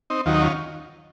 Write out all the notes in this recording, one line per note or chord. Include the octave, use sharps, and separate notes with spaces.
C4 D#4
D#2 D#3 F#3 F4
D#4
C#4 F4